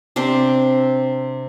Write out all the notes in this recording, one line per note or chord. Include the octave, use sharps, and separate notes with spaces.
C3 C4 D4 C5